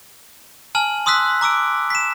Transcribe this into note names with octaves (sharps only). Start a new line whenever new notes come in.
G#5 A5 F6 F#7
C6 D#6 E6 F#6 B6
A#5 D6 E6 D7
B6 E7